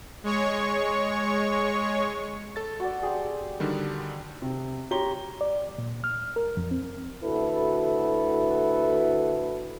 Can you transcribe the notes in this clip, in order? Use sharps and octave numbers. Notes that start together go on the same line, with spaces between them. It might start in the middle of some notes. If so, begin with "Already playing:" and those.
G#3 C#5 C#6
A4 A6
F#4 D5
C4 G4 G#4
D3 D#3 G3
C3
G4 C#5 A#5 C6 G7
D5
A#2
F6
A#4
F2
C4
D2 E4 F#4 A4 B4